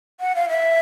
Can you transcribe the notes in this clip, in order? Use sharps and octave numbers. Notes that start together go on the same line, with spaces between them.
F#5
F5
E5